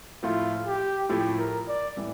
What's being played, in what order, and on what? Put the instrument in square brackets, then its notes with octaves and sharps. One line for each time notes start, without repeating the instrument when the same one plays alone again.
[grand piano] A2 F3 A3 E4 [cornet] F4
[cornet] G4
[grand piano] A2 F3 A3 E4 [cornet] G4
[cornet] A#4
D5
[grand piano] A2 E3 G3